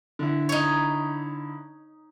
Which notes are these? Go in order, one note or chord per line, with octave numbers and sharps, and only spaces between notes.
D3 E4
D#4 C#5